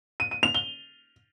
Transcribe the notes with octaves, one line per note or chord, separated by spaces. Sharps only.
D#7
D#7
F7
G7